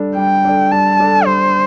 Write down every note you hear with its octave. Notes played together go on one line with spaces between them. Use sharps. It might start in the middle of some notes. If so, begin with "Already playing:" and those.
Already playing: G3 D4 A4 D5
G3 G5
D4 A4 D5
G3 A5
D4 A4 D5
G3 C5